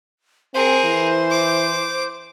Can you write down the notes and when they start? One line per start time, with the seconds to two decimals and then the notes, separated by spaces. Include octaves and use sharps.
0.54 C4 G#4 A#4 C5
0.84 E3
1.31 D6